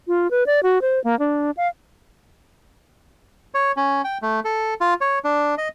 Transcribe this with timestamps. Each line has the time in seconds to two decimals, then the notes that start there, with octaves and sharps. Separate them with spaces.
0.08 F4
0.31 B4
0.47 D5
0.63 F#4
0.82 C5
1.04 A#3
1.19 D4
1.57 F5
3.54 C#5
3.77 C#4
4.04 G5
4.22 A3
4.45 A4
4.81 F4
5.01 C#5
5.24 D4
5.58 D#5